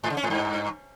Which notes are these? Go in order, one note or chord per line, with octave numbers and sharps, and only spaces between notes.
G#2
C#3
C#4
G#2
G2